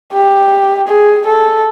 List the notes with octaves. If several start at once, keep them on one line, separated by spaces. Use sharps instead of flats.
G4
G#4
A4